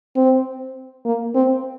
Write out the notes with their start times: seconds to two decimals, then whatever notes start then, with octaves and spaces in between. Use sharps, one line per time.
0.16 C4
1.05 A#3
1.35 C4